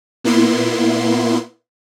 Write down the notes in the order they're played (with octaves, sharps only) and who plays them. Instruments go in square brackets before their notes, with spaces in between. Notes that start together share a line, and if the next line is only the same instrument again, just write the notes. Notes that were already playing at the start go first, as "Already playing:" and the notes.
[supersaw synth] A#2 A#3 B3 E4 C6